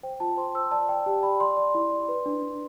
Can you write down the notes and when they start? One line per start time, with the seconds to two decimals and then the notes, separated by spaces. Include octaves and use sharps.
0.03 C5 G5
0.20 F4 A5
0.37 C5 C6
0.55 C5 E6
0.71 D5 A5
0.89 D5 G5
1.06 G4 A5
1.23 D5 B5
1.40 D5 C6
1.57 D5
1.75 E4
1.92 D5
2.09 B4
2.26 D4
2.43 D4